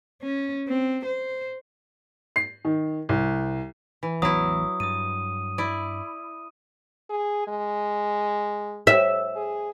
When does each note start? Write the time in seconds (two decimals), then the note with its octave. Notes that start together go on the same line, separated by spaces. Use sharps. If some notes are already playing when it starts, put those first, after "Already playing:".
0.22 C#4
0.68 C4
1.05 C5
2.36 C7
2.65 D#3
3.09 C2
4.03 E3
4.22 A1 E3 F#3 B3 E4 D#6
4.80 G2 D#6 D#7
5.58 E4 D5
7.10 G#4
7.47 G#3
8.87 E5
9.36 G#4